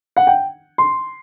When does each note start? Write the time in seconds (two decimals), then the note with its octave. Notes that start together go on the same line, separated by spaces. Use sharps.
0.17 F#5
0.27 G5
0.78 C6